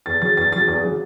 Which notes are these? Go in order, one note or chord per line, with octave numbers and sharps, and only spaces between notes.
E2 A6
C#3 F#3 A6
E2 A6
C#3 F#3 A6
E2 A6
C#3 F#3